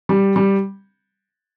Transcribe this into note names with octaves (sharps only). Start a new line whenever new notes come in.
G3
G3